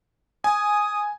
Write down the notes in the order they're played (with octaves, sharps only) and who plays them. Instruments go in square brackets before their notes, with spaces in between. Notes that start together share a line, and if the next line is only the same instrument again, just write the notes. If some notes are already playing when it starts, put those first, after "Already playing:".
[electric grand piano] G#5 [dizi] D#6